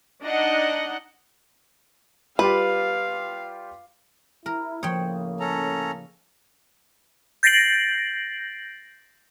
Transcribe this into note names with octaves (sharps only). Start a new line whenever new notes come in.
D4 D#4 D#5 F#5
G3 F4 G4 B4 F5
E4 A#4
A2 C#3 F3 A#3 C#5 G5 D#6
C#4 A4 A#5
G6 A6 A#6 C7 D7 F#7